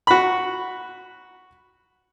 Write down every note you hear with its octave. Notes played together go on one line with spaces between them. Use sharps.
F#4 B5